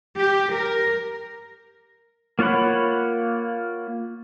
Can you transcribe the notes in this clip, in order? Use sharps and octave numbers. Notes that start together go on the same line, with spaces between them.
G4
A#4
A#3 F4 C#5 F#5 B5